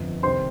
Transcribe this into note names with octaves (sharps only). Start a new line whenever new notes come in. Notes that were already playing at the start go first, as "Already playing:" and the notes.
Already playing: G1 F2
C2 C3 D#3 C5 C6